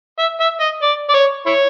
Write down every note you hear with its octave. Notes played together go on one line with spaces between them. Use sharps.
E5
E5
D#5
D5
D5
C#5
E4 C#5